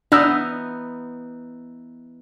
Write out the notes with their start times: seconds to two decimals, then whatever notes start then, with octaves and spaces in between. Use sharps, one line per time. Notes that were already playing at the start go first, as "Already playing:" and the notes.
0.12 E3 B3 D4 D#4 E6